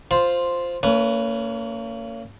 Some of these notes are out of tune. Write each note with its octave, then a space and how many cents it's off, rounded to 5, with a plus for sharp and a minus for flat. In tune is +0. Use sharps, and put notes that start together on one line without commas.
F4 +0 C5 +0 B5 -35
A#3 -35 C#4 +25 B4 +0